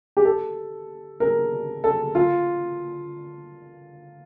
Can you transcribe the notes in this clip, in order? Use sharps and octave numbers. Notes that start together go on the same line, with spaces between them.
G4
A4
A#4
A4
F4